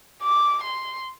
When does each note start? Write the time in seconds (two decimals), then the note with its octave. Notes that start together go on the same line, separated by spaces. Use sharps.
0.22 D6
0.63 C6